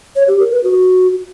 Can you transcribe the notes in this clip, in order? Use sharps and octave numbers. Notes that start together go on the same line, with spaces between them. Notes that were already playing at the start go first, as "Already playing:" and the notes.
C#5
G4
A#4
B4
F#4